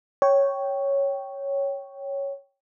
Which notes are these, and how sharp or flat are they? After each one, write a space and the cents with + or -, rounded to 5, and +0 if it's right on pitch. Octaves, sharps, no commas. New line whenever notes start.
C#5 +0 G5 -10